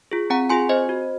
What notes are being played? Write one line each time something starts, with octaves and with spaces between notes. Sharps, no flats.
F4 G#4
C4 F#5 A#5
F4 G#4 G#5 C6
C4 C5 D#5
F#4